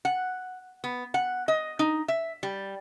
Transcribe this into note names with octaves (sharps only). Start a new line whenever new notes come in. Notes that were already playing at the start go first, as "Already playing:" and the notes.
F#5
B3
F#5
D#5
D#4
E5
G3